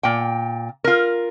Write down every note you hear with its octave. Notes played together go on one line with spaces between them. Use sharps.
A#2 G5
F4 A#4